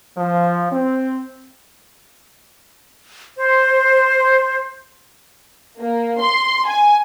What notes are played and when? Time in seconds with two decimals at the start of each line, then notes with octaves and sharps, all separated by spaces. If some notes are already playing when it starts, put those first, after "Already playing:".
0.18 F3
0.72 C4
3.36 C5
5.79 A#3
6.20 C6
6.67 G#5